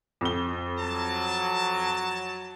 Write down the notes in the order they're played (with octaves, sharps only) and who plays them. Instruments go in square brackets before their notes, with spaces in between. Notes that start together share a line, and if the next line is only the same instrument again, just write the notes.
[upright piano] F2 G7
[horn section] F#3 A5